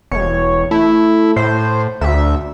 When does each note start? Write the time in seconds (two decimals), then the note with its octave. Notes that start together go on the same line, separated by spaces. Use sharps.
0.11 E1 C#5
0.71 A3 E4
1.36 A2 C5
2.01 D2 E5